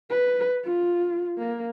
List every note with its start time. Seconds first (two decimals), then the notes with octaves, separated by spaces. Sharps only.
0.10 B4
0.64 F4
1.38 A#3